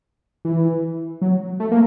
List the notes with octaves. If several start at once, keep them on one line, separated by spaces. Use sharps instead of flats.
E3
F#3
A3
A#3